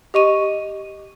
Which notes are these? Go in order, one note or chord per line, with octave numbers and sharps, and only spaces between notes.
G4 D#5 C#6 D#7